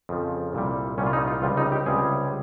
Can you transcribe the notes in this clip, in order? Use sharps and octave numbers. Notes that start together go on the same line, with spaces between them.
F2 C#3 F3
C2 A#2 G3
C2 A#2 G3 C#4
F4
D#4
F4
C#2 C3 G3 F4
D#4
G4
C#2 C3 G3 G#4